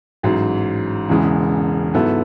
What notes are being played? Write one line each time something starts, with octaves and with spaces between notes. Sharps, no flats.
A1 G#2 F#3
E1 E2 C#3 E3 G#3
G#2 F#3 B3 E4 A4